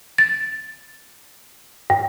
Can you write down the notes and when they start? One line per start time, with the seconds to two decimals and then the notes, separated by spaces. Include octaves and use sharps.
0.18 A6
1.90 G2